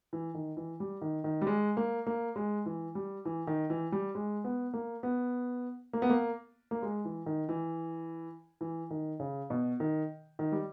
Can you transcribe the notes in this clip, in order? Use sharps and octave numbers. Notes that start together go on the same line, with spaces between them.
E3
D#3
E3
G3
D#3
D#3
G3
G#3
A#3
A#3
G#3
E3
G3
E3
D#3
E3
G3
G#3
B3
A#3
B3
A#3
B3
A#3
A#3
G#3
E3
D#3
E3
E3
D#3
C#3
B2
D#3
D#3
G3